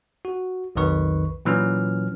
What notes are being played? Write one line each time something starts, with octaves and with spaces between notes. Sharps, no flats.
F#4
B1 F2 D#3 B4 C#6
A#2 E3 F#3 C#4 F6